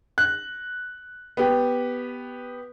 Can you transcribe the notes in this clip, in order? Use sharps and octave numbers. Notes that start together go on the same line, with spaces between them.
F#6
B3 G4